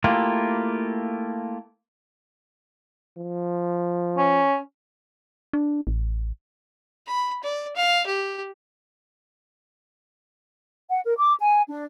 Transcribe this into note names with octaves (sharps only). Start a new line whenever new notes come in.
A3 A#3 E4 F4 G4
F3
C#4
D4
A1
B5
D5
F5
G4
F#5
A#4
D6
G#5
D4